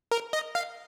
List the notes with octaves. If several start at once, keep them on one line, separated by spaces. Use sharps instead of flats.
A#4
D#5
F5